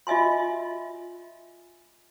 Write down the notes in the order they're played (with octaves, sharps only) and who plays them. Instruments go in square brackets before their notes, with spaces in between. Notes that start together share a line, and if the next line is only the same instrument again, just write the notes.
[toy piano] F4 D#5 E5 G#5 C6